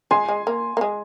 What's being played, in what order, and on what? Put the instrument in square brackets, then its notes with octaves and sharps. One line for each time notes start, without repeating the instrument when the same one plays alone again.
[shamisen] G#3 [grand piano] G#5 C6
[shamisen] G#3
A#3
A#3
G#3